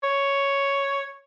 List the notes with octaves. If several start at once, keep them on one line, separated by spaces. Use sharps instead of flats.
C#5